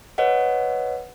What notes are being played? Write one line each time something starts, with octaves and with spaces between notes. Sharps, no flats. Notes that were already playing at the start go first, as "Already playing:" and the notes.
B4 C#5 D#5 F#5